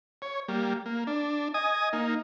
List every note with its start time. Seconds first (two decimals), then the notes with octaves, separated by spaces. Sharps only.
0.22 C#5
0.48 G3 A#3
0.86 A#3
1.07 D4
1.54 D#5 G#5 D#6
1.93 A#3 D#4